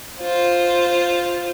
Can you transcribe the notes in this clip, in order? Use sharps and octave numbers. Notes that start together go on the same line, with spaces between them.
F4 C5